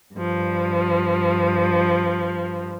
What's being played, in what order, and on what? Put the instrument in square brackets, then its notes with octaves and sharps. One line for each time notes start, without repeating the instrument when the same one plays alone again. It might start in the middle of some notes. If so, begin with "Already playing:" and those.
[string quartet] G2 F3